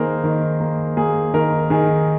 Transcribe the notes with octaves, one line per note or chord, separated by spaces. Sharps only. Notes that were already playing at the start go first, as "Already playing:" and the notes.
Already playing: D#3 A#3 G#4 A#4 C5
D#3
A#3
A#3 G#4
D#3 A#4
D#3 G#4